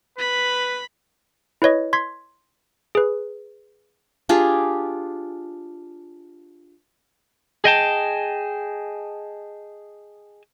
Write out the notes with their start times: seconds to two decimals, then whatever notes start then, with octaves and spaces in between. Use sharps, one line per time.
0.19 B4 B5
1.62 E4 B4 C#5 D#5
1.93 C6 G#6 B6
2.95 G#4 B4
4.29 D4 F4 G4 G#4
7.64 G#4 D#5 G5 A5